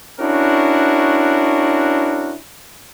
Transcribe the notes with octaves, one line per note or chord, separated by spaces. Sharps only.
C#4 D4 E4 F#4 A#4